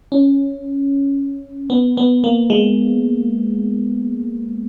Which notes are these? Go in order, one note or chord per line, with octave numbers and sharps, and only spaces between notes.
C#4
B3
B3
A#3
G#3